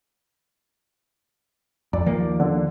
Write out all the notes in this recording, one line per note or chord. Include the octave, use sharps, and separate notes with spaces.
F2 D5
D#2 F3 A#3
D3